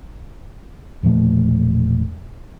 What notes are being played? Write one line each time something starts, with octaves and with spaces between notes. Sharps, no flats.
E1 A#2 F3 A3